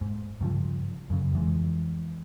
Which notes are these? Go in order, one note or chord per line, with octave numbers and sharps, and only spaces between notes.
G#2
G2 C#3 F3
F#2 C#3
F2 E3 G#3